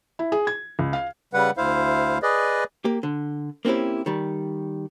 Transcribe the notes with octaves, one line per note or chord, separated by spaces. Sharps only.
E4
G#4
G#6
C#2
F5
C#3 G3 B4 F#5
D2 E4 C5 F5
G#4 B4 D5 D#5
A#3 G4
D3
A#3 C4 C#4 E4 G4
D#3 G3